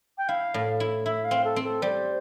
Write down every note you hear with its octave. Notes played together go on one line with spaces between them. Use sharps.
G5
E4 F5
A2
E4
E4 E5
F5
C4
A4
C4
A4
G3 C5